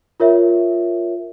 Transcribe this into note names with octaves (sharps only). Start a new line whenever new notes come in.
F4 A#4 C#5 E5